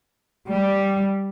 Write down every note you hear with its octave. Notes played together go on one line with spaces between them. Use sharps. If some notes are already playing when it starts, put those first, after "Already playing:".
G3